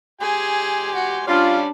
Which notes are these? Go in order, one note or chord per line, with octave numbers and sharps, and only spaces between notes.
G4 G#4 G#5 C6
F#4
G3 C#4 D4 F4 D5